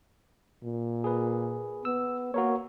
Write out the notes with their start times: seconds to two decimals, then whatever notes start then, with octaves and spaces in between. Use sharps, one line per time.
0.64 A#2
1.04 G#4 B4
1.85 B3 E6
2.34 A#3 F#4 A#4 C#5